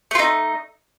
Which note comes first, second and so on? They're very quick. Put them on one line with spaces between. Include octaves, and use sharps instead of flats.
A3 F4 D#4